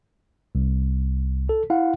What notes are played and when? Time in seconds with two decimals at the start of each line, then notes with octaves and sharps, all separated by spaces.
0.55 C2
1.49 A4
1.70 E4 F5 F#5